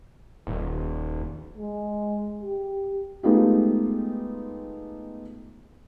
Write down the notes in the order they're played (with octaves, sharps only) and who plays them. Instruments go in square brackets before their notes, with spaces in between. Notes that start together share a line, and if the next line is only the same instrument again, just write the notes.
[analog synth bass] D#1
[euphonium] G#3
G4
[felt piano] G#3 A3 B3 D#4 F4 G4